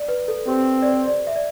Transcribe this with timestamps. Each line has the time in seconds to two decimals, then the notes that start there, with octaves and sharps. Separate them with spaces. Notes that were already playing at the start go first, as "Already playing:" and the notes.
Already playing: D5
0.08 B4
0.28 A4
0.48 C4 G4
0.82 D5
0.87 C5
1.07 D5
1.27 E5
1.36 D5